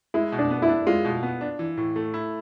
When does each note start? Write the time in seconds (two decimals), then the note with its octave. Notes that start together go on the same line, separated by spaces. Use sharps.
0.14 G#3 E4
0.32 B2
0.39 D4
0.50 B3
0.62 E4
0.68 D4
0.87 G#3 F4
1.05 B2
1.23 B3
1.41 D4
1.59 E3
1.77 A2
1.96 A3
2.14 E4